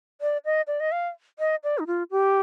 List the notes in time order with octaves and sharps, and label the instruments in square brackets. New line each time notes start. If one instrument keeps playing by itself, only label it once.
[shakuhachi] D5
D#5
D5
D#5
F5
D#5
D5
D#4
F4
G4